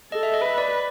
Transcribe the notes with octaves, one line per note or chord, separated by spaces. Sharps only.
A4 D#5
E5
D#5
B4
D5